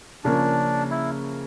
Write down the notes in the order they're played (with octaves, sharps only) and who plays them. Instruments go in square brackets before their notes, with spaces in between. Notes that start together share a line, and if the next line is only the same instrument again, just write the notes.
[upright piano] C#3 F3 A#3 C#4 [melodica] D4
[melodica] E4